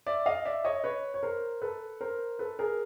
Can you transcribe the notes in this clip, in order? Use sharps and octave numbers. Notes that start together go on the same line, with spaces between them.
D5 E5
D#5 F5
D5 E5
C#5 D#5
B4 C#5
C#5
A#4 C5
A4 B4
A#4 C5
A4 B4
G#4 A#4